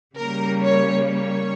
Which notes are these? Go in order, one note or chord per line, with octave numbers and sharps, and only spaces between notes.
C#3 G3 A#3 A#4
C#5
C#5